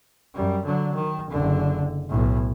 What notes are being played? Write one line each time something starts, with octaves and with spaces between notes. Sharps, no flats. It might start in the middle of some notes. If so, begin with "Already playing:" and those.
F#2 G3
D3 F#3
D#3
F#1 D3
B1 A2